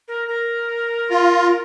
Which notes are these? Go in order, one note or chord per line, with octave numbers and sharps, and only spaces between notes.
A#4
A#4
F4